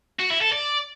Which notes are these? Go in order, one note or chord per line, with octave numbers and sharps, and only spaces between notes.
F#4
E4
A4
D5